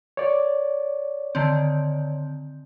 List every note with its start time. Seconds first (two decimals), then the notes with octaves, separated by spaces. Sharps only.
0.17 C#5 D5
1.35 D3 D#3 C4